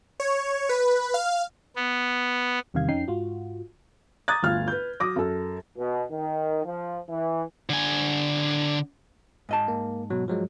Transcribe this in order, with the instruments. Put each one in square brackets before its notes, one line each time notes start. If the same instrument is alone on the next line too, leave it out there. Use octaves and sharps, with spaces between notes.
[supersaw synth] C#5
B4
F5
[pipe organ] B3
[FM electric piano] E2 C3 D#3 G3 F5 G#6
F2 C#4 D#4 G5 C7
G#2 F4 F#4
[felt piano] A#5 D6 D#6 F#6 G#6 A6
G1 D2 F4 F5 F6
B4 G6
F#3 D6 D#6 A#6
F#2 A4
[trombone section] B2
D#3
F3
E3
[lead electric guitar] D3 G#5
[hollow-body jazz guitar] G#2 D#5 A5
[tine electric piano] A#3
B2 F#3
F3 F#3 G#3